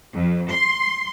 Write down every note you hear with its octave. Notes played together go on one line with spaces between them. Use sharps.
F2
C6